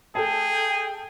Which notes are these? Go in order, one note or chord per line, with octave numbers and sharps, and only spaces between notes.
G#4 A4 G5 A5